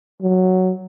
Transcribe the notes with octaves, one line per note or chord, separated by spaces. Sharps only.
F#3